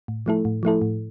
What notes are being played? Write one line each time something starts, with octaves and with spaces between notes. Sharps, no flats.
A2
F3 A3 E4 A4
A2
F3 A3 E4 A4
A2